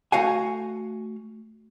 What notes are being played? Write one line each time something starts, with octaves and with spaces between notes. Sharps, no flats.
A3 F#4 F5 F#5 G#5